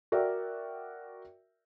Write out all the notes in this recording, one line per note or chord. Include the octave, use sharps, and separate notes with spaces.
F#4 A#4 D5 E5 G5